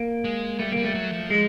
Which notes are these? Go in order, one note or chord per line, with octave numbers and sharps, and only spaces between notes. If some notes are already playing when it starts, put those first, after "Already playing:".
Already playing: A#3
G#3
G3 A3
G3 A#3
A3
F#3
F3
G#3